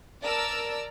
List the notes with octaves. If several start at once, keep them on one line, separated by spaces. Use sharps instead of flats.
A#4 D5 A5 A#5 E6